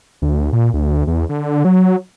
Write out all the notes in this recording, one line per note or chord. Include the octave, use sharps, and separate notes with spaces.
D2
A#2
D2
E2
D3
F#3